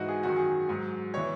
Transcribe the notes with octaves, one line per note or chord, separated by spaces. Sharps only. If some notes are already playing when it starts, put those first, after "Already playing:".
Already playing: G#2 E3 D#4 F#4
G#4
F#2 D#3 F#3 F#4
G#4
G#2 F#3
E3 C#5